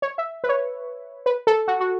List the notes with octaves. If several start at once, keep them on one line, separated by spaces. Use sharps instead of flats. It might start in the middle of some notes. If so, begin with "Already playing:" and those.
C#5
E5
B4
C#5
B4
A4
F#4
F#4